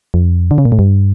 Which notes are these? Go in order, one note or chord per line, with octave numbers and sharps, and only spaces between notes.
F2
D3
C#3
A#2
A2
G2